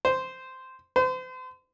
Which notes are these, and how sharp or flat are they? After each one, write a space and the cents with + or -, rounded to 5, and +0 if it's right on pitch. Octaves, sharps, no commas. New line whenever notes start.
C5 -10
C5 -40